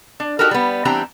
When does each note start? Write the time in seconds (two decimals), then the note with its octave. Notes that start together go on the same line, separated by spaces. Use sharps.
0.20 D4
0.39 D#4 F#4 G4 A4 A#4
0.51 G3 B3
0.85 E3 G3 C4 D4 G4 A#5